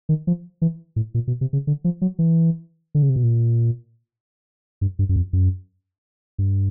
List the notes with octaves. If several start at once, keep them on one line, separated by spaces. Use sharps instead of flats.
D#3
F3
E3
A2
A#2
B2
C3
C#3
D3
F3
F#3
E3
D3
C#3
C3
B2
A#2
G2
G2
F#2
F2
F#2
G2